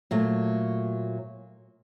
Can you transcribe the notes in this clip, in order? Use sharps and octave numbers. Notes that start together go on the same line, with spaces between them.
A#2 F#3 A3